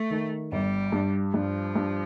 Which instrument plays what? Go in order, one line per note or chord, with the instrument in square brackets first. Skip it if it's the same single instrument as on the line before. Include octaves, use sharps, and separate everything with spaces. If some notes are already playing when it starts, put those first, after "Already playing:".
Already playing: [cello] A3
[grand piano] D#3
[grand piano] G1 [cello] G3
[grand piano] G2
[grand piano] G2 [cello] F3
[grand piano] G2